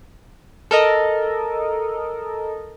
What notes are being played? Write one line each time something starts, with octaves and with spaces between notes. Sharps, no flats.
A4 A#4 D#5